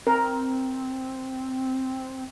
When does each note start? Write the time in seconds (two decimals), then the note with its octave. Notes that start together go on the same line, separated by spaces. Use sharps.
0.07 C4 A#4